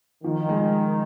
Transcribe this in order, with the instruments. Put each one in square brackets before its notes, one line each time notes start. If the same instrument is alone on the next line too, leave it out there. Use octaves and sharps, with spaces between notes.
[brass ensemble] D#3 [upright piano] F3
[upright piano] G#3